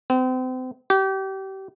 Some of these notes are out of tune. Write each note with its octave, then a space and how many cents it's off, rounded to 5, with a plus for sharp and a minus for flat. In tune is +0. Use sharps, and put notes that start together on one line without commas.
C4 -35
G4 -30